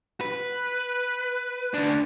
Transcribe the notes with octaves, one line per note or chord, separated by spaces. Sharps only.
B4
D2 D4